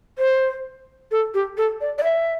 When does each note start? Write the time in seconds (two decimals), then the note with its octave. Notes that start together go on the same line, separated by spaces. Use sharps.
0.18 C5
1.11 A4
1.34 G4
1.57 A4
1.81 D5
1.98 D5
2.04 E5